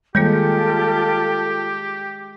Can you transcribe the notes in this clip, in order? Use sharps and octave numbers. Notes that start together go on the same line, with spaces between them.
D#3 G3 G#3 A#3 F4 G4 A4 G5